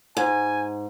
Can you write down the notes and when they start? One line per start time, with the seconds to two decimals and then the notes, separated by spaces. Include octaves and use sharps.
0.17 G#2 G#5